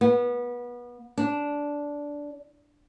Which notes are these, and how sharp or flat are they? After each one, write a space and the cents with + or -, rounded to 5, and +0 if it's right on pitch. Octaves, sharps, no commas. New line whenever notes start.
B3 -25
D4 -10